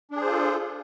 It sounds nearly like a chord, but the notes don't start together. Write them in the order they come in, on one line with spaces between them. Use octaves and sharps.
D4 G#4 C5 F4 A4